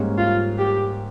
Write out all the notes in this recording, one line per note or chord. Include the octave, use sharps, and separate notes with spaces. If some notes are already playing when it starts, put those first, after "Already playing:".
Already playing: G#2 G3 A#3 C#4
F4
G4